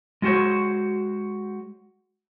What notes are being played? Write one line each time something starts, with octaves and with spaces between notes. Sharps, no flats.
G#3 F4 F#4 C5 C#5